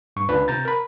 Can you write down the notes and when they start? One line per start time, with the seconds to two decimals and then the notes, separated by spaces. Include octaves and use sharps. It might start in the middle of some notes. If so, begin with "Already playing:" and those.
0.16 G2 C#6
0.29 C#2 D3 D4 F4 B4
0.48 C3 A#5 G6 A6
0.65 A#4 B5